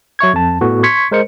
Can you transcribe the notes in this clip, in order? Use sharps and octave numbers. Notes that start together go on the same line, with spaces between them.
F#3 E5 C#6 G#6
F2 A5
A2 B3 F#4 A4
C6 C#6 G#6 B6 C#7
G#3 A#4 C5 D#5 C#7